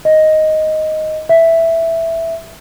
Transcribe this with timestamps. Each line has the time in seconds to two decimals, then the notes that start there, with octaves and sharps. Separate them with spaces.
0.05 D#5
1.29 E5